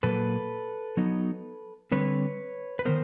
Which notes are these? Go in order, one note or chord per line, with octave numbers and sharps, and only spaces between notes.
A#2 F#3 A#3 A4 B4
F#3 B3 D#4
D3 G3 C4 B4 C#5
B4
D#3 G3 B3 A#4 C5